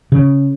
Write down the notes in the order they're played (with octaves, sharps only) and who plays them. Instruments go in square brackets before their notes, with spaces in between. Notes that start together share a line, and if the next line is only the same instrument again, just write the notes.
[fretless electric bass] C#3